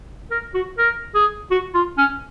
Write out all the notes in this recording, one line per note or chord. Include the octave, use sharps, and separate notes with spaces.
A#4
F#4
A#4
G#4
F#4
F4
C#4